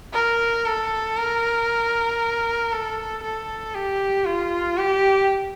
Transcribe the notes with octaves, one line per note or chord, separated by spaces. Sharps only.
A#4
A4
A#4
A4
A4
G4
F4
G4